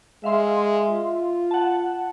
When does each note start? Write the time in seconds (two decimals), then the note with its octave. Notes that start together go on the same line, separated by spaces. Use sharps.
0.24 G#3 E5 F5 C6
0.90 F4
1.51 F#5 A5